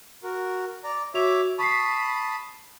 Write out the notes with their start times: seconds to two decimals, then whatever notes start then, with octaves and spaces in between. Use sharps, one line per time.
0.23 F#4 A#4
0.84 D5 A#5
1.14 F#4 C#5 E5 D6 F7
1.59 A5 B5 C#6 D#6 B6 C7